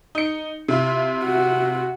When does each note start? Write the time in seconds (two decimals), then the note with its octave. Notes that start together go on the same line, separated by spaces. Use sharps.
0.15 D#4 C#7
0.68 C3 E4 F4
1.25 F#4